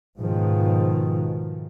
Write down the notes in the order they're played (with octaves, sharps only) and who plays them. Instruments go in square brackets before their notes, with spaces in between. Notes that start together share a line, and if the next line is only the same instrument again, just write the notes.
[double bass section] G#2 B2 D#3 F3